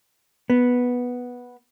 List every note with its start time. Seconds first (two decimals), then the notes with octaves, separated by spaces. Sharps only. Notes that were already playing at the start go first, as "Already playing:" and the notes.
0.50 B3